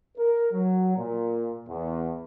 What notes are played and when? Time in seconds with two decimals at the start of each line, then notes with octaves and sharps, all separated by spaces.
0.17 A#4
0.52 F#3
0.97 A#2
1.69 E2